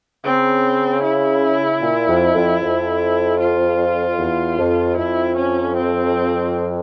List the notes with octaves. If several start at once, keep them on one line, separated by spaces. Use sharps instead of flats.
C#3 C4
E4
A#2
F2
F2
F2
F4
E2
F2
F2 E4
C#4
C4